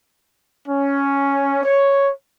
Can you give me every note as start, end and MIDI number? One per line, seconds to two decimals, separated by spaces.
0.67 1.60 61
1.64 2.10 73